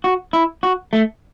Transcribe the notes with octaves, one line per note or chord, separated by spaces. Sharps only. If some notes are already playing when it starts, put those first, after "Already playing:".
F#4
E4
F#4
A3